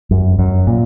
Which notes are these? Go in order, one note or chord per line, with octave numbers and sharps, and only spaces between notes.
F#2
F#2
A#2